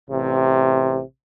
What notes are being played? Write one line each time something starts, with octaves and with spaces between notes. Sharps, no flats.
A1 C3